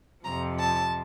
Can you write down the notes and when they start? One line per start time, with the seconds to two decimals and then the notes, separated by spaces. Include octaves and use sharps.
0.24 F2 C3 F3 A#5
0.59 A5